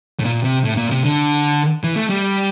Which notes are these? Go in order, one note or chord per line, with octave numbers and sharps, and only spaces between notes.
A2
A#2
C3
A2
A#2
C3
D3
E3
A3
G3